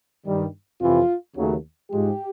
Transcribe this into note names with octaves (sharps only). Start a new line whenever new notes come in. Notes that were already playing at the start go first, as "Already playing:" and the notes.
G2 D#3 G3
F2 C3 E3 F4
D#2 C#3 F#3 A3
G#2 F3 G#3 G4